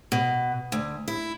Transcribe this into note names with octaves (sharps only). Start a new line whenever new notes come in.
B2
D2
E4